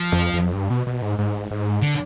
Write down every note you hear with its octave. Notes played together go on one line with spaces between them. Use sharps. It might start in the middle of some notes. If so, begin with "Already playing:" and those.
Already playing: F3
F2
F2
G2
B2
B2
G#2
G#2
G#2
D3